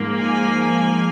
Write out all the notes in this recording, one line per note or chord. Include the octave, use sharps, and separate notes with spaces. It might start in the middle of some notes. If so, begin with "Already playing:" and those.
Already playing: G#2 F3 A#3
G#5